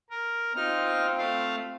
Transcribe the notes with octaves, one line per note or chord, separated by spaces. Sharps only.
A#4
C4 D#4 F4 F6
A3 F5